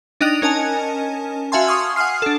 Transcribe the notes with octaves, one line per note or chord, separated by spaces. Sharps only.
D4 D#4 D#5 G5 F#6 F7
C#4 A#4 D#5 G#5 A5
F#4 E5 F5 G#5 A5 C6
C6 C#6 D#6 F6 G#6
F#5 G#5 D#6 F6 C7
D4 A4